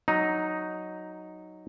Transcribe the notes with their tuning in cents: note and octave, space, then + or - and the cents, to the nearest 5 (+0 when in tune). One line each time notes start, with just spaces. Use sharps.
F#3 +0 D#4 +0